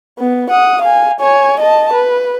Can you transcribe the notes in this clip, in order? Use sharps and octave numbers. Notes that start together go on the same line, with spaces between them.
B3
F#5 D#6
F5 G#5
C#5 G#5
D#5 A5
B4